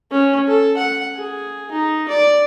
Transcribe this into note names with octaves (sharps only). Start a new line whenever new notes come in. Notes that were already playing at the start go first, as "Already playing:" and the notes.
C#4
A4
F#5
G#4
D#4
D5